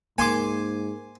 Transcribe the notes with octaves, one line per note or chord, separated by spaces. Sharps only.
G#2 A#3 G#5 C6 D6